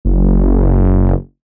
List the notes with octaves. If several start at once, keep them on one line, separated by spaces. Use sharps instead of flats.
F#1